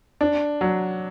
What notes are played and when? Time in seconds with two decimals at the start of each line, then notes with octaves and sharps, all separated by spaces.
0.21 D4
0.61 F#3